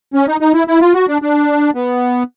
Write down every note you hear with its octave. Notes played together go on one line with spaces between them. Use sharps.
C#4
D#4
D#4
E4
E4
F4
F#4
D4
D4
B3